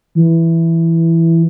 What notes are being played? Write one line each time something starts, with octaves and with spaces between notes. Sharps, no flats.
E3